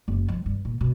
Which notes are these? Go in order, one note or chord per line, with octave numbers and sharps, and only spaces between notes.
F#1
F3
G2
A#2
B2